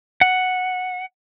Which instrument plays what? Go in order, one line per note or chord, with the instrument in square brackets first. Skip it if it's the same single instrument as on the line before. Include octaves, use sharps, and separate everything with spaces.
[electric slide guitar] F#5